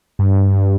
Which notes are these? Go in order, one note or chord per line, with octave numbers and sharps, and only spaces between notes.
G2